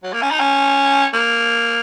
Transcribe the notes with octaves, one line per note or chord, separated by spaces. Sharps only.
F#3
A#3
C#4
D#4
C#4
A#3